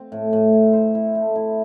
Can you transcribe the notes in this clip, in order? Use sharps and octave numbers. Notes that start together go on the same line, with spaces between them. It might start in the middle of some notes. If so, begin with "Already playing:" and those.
Already playing: C4
A2
A2
E4
C5
E4
A3
E4